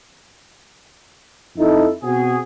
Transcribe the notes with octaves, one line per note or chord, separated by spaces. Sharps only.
F2 D#4 E4 A4
B2 C4 F#4 G#4